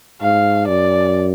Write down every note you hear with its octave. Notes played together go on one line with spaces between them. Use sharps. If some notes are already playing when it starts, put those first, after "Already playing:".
G#2 F5
F#2 D5